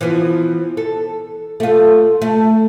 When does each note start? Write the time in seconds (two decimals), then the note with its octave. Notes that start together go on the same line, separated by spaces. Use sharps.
0.01 E3 F3 B3
0.77 A4
1.60 A3 F4
2.22 A3